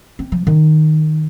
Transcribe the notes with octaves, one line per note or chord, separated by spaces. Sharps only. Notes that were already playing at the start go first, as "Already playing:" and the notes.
C4
F3
D#3